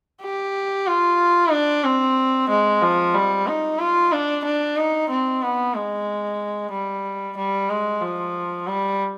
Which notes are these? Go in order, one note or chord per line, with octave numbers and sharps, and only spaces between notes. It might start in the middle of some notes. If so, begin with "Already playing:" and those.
G4
F4
D4
C4
G#3
F3
G3
D#4
F4
D4
D4
D#4
C4
B3
G#3
G3
G3
G#3
F3
G3